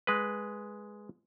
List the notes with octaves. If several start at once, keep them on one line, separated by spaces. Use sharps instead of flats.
G#3 B4